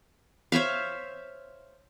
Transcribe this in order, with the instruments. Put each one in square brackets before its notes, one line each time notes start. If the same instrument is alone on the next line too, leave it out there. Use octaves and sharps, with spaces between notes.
[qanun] C5 C#5 E5 F5